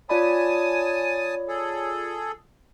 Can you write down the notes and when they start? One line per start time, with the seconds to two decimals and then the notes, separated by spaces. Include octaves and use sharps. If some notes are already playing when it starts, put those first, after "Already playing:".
0.09 F4 C#5 D5 G#5 A5 B5 D#6
1.48 G#4 A4